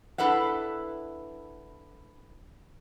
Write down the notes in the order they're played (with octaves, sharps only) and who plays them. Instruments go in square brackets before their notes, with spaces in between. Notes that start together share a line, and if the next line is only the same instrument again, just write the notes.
[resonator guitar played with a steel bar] D4 E4 A4 B4 E5 F#5